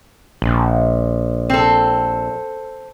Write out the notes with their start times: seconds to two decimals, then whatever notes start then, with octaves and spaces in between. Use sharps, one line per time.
0.42 A#1
1.50 C4 A4